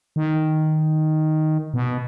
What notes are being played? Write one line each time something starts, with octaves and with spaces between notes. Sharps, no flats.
D#3
B2